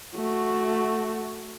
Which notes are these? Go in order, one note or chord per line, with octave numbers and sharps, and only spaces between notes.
A3 F#4